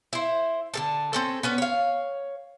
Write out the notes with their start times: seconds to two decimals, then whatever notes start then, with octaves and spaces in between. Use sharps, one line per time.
0.13 E4 C5
0.74 D3 A4 A5
1.13 C4 C#4 A4
1.43 B3 C#4 B4
1.58 C#5 F5